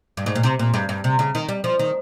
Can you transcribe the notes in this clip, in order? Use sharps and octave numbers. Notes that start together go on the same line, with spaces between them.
G2
G#2
A#2
C3
A#2
G2
G2
C3
C#3
D#3
G3
F3
D#3